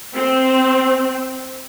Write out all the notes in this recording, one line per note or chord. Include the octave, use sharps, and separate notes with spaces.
C4